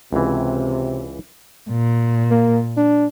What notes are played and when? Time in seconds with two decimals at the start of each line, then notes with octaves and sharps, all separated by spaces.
0.13 C#2 C3 E3
1.70 A#2
2.31 A#3
2.77 D4